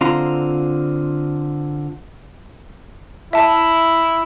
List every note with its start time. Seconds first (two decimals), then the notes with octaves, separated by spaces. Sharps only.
0.01 D3 C4 F4 A#5 C6
3.33 E4 E5 A5